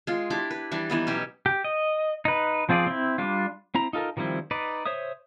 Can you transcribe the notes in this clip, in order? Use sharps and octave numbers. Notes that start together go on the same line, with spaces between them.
G#3 F4
D4 E4 G4 D6
B4
E3 G3 D4
E3 B3 D#4
B2 F#3 C#4 G4
G4
D#5
D#4 B4
F3 C4 F4 G#4 D5
C4 E4
G3 D4 F4
C4 E4 A#5
D#4 F4 A4 A#4
D#3 F3 G3 C4 E4
D#4 B4 D5
C5 C#5 E5 D#6